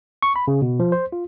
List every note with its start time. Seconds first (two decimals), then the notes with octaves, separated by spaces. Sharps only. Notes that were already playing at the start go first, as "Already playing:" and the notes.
0.22 C#6
0.36 B5
0.48 C#3
0.62 B2
0.80 F3
0.92 C5
1.12 F4